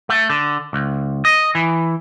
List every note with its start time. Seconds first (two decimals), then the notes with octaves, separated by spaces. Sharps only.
0.09 A3
0.30 D3
0.73 C#2
1.25 D#5
1.55 E3